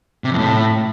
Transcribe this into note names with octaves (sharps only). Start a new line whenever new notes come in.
C3
F2
A2